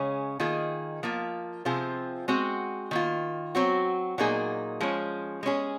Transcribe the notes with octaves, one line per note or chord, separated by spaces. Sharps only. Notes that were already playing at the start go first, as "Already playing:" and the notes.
Already playing: C#3 G#3 C#4 G#4
D#3 A#3 F4 G#4
F3 A#3 F4
C3 F3 C4 F4 G#4
G#3 C4 F#4
D#3 A#3 F4
F#3 C4 F#4
A#2 F#3 A#3 D#4 G#4
F3 G#3 C#4
G#3 C#4 G#4